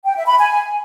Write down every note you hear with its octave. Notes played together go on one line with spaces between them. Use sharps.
G5
E5
B5
G#5